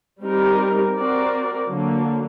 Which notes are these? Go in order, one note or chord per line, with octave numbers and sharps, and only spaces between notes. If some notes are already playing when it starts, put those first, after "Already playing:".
G3 C4 D#4 G4 A#4
C4 F#4 A#4 D5
D3 F#3 A#3